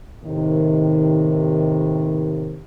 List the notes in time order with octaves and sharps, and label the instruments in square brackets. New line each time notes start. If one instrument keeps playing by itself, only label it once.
[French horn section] D#2 A2 C3 D#3